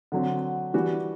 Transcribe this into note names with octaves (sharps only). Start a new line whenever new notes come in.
D3 F#3 C4
E3 G3 D4 F#4